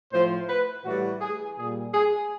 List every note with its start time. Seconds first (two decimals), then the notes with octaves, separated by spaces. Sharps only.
0.12 A2 F3 C5
0.49 B4
0.85 A2 E3 G3 F#4
1.21 G#4
1.58 A#2 G3 G#4
1.94 G#4